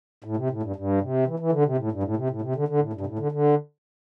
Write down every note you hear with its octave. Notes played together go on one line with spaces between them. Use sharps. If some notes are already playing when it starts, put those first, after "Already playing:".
A2
C3
A2
G2
G2
C3
E3
E3
D3
C3
A2
G2
A2
C3
A2
C3
D3
D3
A2
G2
C3
A2
D3
D3